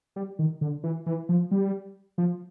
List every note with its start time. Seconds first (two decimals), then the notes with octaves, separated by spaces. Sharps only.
0.16 G3
0.39 D#3
0.61 D3
0.83 E3
1.06 E3
1.29 F3
1.51 G3
2.18 F3